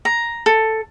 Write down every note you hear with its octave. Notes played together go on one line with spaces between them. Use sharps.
A#5
A4